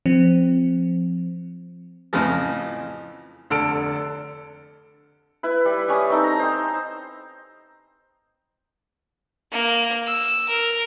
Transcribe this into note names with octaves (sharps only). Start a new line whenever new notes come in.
F3 C4
F2 A2 C#3 E3 F3
F1 D3 A4 E6 F6 D7
E4 B4
G3
G3 C#4 D#6
C4 D#4 A4
A#5
C5 G5
A#3
E6
A#4